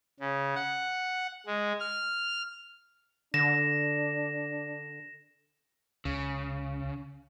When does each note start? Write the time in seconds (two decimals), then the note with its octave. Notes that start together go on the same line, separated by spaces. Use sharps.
0.20 C#3
0.55 F#5
1.47 G#3
1.80 F6
3.34 D3 D4 A#6 E7
6.05 C#2 C#3